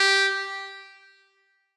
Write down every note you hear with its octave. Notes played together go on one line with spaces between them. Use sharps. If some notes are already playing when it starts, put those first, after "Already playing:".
Already playing: G4